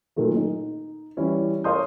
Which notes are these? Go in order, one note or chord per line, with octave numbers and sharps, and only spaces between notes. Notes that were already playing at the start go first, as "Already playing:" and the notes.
A#2 D#3 F#3 A3 A#3
D#4
E3 G3 C#4 E4
A#4 C#5 F5 C6 D#6 G6